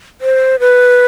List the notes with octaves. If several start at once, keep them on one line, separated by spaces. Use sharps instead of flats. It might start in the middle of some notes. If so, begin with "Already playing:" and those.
C5
B4